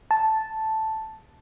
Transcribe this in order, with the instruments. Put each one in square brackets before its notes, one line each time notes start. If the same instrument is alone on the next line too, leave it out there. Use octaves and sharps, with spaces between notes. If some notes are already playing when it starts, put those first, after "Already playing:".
[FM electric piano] A5